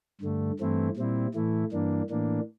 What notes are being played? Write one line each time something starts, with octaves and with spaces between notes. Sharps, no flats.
G2 D3 A3
G2 E3 A3 C4 E4
A#2 G3 C4 E4
A2 E3 A3 E4
G2 E3 A#3 D4
A2 E3 A#3 D4